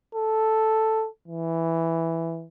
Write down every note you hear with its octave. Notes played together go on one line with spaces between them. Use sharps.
A4
E3